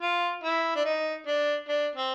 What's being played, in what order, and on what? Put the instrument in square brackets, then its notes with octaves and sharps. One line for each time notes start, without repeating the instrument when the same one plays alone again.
[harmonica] F4
E4
D4
D#4
D4
D4
C4